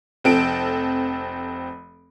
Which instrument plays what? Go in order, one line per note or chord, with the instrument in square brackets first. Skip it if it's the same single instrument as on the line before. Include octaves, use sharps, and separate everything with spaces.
[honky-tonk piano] F1 C4 A4 D7